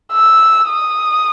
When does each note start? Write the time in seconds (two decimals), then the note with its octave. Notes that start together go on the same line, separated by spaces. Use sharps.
0.12 E6
0.68 D#6